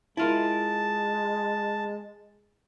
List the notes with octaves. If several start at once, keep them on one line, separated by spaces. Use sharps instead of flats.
G#3 E4 F4 A#4 A5